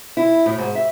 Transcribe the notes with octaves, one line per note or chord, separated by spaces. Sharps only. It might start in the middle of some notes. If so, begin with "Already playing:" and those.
E4
A2
G#2
E5